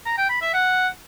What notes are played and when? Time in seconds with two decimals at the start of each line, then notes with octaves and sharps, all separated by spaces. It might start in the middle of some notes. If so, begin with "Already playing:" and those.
0.06 A#5
0.18 G5
0.30 B5
0.42 E5
0.53 F#5